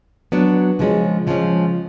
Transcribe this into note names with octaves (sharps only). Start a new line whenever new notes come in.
F#3 B3 D4
C#3 F3 G#3 C#4
C#3 F3 G#3 C#4